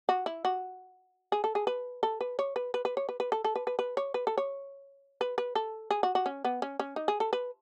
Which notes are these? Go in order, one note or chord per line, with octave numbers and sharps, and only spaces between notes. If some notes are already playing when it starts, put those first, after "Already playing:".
F#4
E4
F#4
G#4
A4
G#4
B4
A4
B4
C#5
B4
B4
B4
C#5
B4
B4
A4
A4
B4
B4
B4
C#5
B4
A4
C#5
B4
B4
A4
G#4
F#4
F#4
C#4
B3
C#4
C#4
D#4
G#4
A4
B4